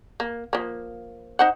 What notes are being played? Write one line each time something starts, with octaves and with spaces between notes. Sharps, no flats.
A#3
F3 A#3
D#4 C5 F#5